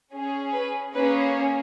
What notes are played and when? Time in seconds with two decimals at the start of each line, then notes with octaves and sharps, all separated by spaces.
0.13 C#4 G#4
0.53 B4
0.94 A#3 C#4 G#4 B4